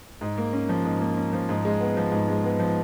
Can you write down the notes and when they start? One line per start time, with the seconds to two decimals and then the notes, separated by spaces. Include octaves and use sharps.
0.21 G#2
0.38 A#3
0.53 C#4
0.69 F3
0.84 G#2
1.01 A#3
1.17 C#4
1.33 F3
1.49 G#2
1.65 G#3
1.80 B3
1.97 F3
2.12 G#2
2.28 G#3
2.44 B3
2.59 F3